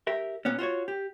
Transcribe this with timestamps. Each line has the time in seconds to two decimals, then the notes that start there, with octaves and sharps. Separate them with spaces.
0.07 G4 A#4 E5
0.45 A#2 B3 C#4
0.59 F4 F#4 C5 C#5
0.88 G4